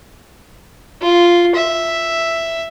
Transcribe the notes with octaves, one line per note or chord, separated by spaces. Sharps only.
F4
E5